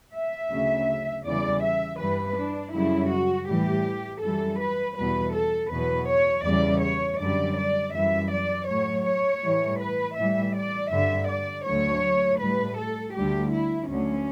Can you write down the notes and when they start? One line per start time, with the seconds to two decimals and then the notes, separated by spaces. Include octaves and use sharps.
0.14 E5
0.51 D2 C#3 F#3
1.26 E2 C#3 E3 G3 D5
1.63 E5
1.99 G2 E3 G3 B4
2.37 D4
2.74 F#2 C#3 G3 E4
3.12 F#4
3.48 A2 E3 G3 G4
4.22 F#2 E3 G3 A4
4.60 B4
4.97 E2 B2 G3 B4
5.34 A4
5.71 E2 B2 F#3 B4
6.09 C#5
6.45 E2 C#3 E3 G3 D5
6.82 C#5
7.20 F#2 D3 G3 D5
7.57 D5
7.94 F#2 E3 G3 E5
8.31 D5
8.68 A2 F#3 C#5
9.06 C#5
9.43 A2 E3 G3
9.80 B4
10.17 A2 E3 G3 E5
10.55 D5
10.91 G2 D3 G3 E5
11.29 D5
11.66 D2 D3 F#3 C#5
12.40 A2 G3 B4
12.77 A4
13.14 D2 D3 G3 G4
13.52 E4
13.89 D2 D3 F#3 C#4